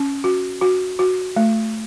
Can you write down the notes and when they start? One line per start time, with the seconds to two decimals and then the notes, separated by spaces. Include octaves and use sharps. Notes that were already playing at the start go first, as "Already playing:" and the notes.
Already playing: C#4
0.24 F#4
0.62 F#4
0.99 F#4
1.36 A3